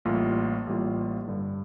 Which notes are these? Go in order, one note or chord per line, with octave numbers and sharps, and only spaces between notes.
A1 A2 G3 A#3 F4
A1 A2 G3 A#3 F4
G2 D3 G3